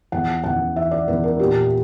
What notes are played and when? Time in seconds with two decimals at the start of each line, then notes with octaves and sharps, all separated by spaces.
0.12 E2 F#5
0.44 E2 F#5
0.76 E3 E5
0.91 D5
1.08 E2 B4
1.23 A#4
1.39 A#2 G4